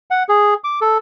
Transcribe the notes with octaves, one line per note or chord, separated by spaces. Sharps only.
F#5
G#4
D6
A4